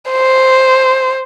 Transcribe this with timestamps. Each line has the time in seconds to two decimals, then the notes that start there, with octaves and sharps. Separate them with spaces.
0.11 C5